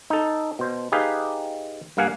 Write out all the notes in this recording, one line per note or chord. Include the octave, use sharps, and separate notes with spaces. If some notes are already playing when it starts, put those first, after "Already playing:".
D#4 A4
B2 C5
D#4 G4 G#4 B4 F5
G2 A#3 F5 F#5 G#5